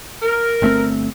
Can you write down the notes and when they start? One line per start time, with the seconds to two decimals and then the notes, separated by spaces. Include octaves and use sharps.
0.22 A#4
0.62 G1 A3 C4